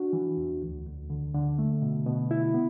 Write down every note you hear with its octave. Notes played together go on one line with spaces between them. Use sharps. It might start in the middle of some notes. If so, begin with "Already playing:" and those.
Already playing: D4 F#4
E3
E2
D2
D2
D3
D3
A3
B2
B2
E4
B3